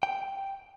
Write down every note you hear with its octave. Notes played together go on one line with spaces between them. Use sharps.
G5